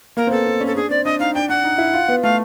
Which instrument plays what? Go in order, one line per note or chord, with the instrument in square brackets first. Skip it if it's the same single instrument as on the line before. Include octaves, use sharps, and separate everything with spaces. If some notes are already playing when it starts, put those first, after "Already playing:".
[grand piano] A#3 [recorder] A#4
[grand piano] C4
[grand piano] B3 [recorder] A4
[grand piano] C4
C#4
[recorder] A4
[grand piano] D4 [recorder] G#4
[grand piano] C4 [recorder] D5
[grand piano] D4 [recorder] D#5
[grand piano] D#4 [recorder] F5
[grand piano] D4 [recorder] G5
[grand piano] D4 [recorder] F#5
[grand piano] D#4
E4
F4
B3
[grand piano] A3 [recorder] F5